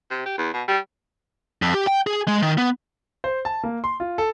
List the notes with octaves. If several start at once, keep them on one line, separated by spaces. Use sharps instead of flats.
C3
G4
E2
B2
G3
F2
G4
G5
G#4
G#3
D#3
B3
C5
A5
A#3
C6
F4
A4